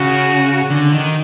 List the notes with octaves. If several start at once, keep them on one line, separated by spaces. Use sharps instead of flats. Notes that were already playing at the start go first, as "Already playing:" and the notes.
Already playing: C#3 F#4
D3
D#3